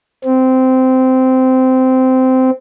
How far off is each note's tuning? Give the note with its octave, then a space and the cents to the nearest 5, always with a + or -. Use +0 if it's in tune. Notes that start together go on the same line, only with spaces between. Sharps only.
C4 -15